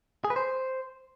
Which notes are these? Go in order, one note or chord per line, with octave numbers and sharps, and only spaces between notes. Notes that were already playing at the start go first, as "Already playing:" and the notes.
G#4
B4
C5